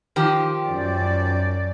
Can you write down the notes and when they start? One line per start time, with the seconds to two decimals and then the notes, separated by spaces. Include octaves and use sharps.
0.16 D#3 F3 G4
0.65 F#2 D5